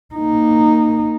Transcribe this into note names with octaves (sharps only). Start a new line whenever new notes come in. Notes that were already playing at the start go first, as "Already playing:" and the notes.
A#3 D#4